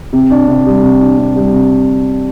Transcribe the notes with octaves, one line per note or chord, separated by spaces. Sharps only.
C3
D4
C3
G3
C3
D4
C3
G3
C3